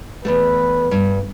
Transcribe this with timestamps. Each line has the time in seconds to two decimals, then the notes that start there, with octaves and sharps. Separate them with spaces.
0.25 E2 G#2 A3 B4
0.91 G2